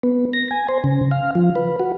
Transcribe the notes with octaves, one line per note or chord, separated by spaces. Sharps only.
B3
A#6
G#5
C5
C#3
F5
F3
B4
F#4